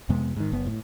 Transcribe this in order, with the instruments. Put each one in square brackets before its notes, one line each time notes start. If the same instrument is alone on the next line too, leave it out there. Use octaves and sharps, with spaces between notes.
[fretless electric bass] F2 C3 G#3 B3
G#2 D#3
F#1 F#2 B3
A2